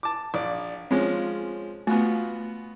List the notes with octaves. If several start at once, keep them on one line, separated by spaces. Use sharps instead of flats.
A5 D6
A#1 D5
F3 G#3 C4 C#4
A3 B3 F4 F#4